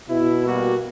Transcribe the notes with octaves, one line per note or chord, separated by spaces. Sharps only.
B2 E4
G3 A#3 F#4